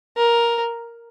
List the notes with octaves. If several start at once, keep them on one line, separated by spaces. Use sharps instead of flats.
A#4